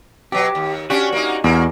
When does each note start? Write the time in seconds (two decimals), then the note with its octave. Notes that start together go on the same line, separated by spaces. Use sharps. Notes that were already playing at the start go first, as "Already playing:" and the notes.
0.32 B2 F#3 G4
0.55 D#2
0.90 C#4 D4 F#4 G4 F#5
1.12 A#3 D#4
1.44 E2 A#3 F#4